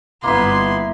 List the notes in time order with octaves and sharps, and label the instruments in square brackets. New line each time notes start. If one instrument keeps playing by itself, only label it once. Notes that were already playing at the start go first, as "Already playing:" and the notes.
[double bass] G1 G2 [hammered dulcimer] A#3 E4 E5 [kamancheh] B3 C6